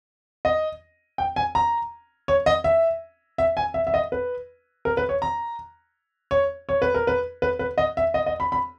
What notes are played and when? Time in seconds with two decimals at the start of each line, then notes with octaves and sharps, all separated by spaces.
0.45 D#5
1.18 G5
1.36 G#5
1.55 A#5
2.28 C#5
2.46 D#5
2.64 E5
3.38 E5
3.57 G#5
3.74 E5
3.87 E5
3.94 D#5
4.12 B4
4.85 A#4
4.97 B4
5.09 C#5
5.22 A#5
6.31 C#5
6.69 C#5
6.82 B4
6.94 A#4
7.07 B4
7.42 B4
7.59 B4
7.78 D#5
7.97 E5
8.14 D#5
8.26 D#5
8.40 B5
8.52 B5